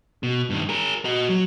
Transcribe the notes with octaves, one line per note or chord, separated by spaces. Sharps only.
B2
G2 D#3
G#4 A#4
F#4 D#5
F#3